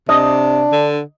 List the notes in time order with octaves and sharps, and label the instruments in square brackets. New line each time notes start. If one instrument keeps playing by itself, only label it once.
[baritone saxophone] C3 [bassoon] D4 [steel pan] D#5
[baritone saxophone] D3